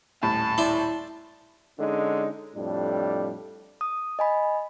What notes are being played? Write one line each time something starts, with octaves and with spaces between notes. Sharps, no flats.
D#1 A2 A5
E4 D5 E5 C6
D3 G#3 C#4 D#4
F2 A2 G3 D4
D#6
D#5 G#5 B5